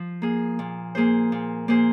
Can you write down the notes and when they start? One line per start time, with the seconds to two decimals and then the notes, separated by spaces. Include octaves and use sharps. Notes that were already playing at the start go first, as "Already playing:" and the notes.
Already playing: F3
0.22 A#3 G#4
0.59 A#2
0.95 A#3 G#4 C5
1.32 A#2
1.68 A#3 G#4 C5